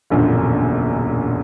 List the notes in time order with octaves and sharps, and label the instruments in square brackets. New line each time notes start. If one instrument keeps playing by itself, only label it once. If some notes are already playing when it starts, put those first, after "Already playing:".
[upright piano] E1 A#1 F#2 A#2 D3